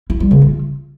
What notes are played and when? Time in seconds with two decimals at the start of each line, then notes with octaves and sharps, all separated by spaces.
0.10 E4
0.20 G3
0.31 C#3
0.42 F4